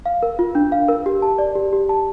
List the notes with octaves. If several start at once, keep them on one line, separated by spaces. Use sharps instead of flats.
F5
A#4
F4
D4
F5
A#4
G4
A5
D5
G4
G4
A5